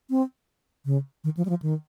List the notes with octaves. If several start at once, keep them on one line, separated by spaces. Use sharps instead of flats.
C4
C#3
D#3
F3
G3
F3
D#3